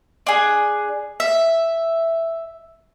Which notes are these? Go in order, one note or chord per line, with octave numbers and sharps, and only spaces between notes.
D4 G#4
E5